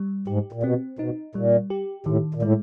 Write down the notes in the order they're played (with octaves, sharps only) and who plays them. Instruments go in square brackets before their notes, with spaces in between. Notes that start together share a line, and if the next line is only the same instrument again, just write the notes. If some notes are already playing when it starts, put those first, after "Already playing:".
Already playing: [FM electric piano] G3
[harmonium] G#2 [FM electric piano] G4
[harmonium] A#2
[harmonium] B2 [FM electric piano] C4
[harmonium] B2 [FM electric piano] D#4
[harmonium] A#2 [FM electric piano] G3
[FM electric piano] G4
[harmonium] A2 [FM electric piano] D#3
[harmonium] A#2
[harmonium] A2 [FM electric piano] G#3